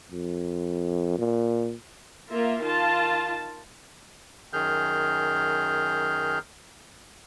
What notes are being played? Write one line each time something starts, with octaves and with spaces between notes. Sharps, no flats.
F2
A#2
A#3 F4 A#4 E5
D#3 F4 A5
F#2 D#3 G#4 F6 G6